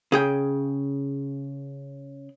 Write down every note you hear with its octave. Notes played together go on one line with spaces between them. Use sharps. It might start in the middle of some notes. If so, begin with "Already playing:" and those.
C#3 G#4 G5